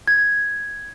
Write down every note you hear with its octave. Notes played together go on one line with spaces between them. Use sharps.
G#6